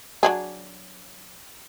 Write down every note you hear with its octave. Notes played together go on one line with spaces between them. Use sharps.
F#3 D4 G#4